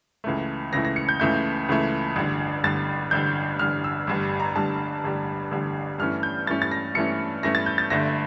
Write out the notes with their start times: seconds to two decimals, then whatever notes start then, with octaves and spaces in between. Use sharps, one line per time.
0.24 C#2 C#3 E3 A3
0.73 C#2 C#3 E3 A3 A#6
0.85 A#6
0.96 C#7
1.09 G6
1.20 C#2 C#3 E3 A3 G6
1.69 C#2 C#3 E3 A3
2.16 A1 G2 D3
2.64 A1 G2 D3 A6
3.11 A1 G2 D3 G6
3.59 A1 G2 D3 F6
3.84 E6
4.07 A1 G2 D3 G3
4.40 A#5
4.56 A1 G2 D3 G3 A5
5.04 A1 G2 D3 G3
5.51 A1 G2 D3 G3
5.98 G2 E3 A3 C#4 F6
6.23 G6
6.47 G2 E3 A3 C#4 A6
6.62 A6
6.71 A#6
6.95 G2 E3 A3 C#4 C#7
7.43 G2 E3 A3 C#4 A#6
7.55 A6
7.66 G6
7.78 A6
7.90 G1 G2 D3 A3 A#6